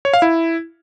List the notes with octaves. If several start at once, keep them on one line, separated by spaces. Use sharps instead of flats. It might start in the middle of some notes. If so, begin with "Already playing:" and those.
C#5
F5
E4